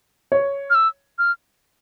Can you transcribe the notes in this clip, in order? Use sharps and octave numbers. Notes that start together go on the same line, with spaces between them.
C#5
F6
E6
F6